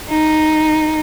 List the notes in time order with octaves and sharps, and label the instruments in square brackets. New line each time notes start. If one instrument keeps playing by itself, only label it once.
[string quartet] D#4